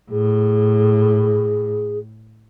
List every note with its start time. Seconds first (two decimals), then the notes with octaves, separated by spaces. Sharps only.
0.11 A2 G#4